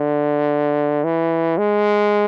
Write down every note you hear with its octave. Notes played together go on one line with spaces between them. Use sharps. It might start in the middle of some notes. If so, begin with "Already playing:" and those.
Already playing: D3
E3
G#3